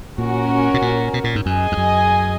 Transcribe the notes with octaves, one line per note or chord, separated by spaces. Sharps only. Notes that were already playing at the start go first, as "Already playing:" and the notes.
A#2 C#4 F#4 A#4
B2
A#2
B2
A#2
G#2
F#2 G#4 D#5 G#5
F2
F#2